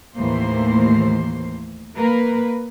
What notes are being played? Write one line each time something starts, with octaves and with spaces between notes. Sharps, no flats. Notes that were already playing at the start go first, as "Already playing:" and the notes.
D#2 A2 E3 A#3 C5
A#3 A#4 B4